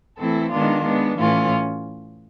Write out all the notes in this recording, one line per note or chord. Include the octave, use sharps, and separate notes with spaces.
E3 A3 C4 E4 A4
D#3 G#3 B3 D4 F4
G#3 B3 D4
A2 E3 A3 C#4 F4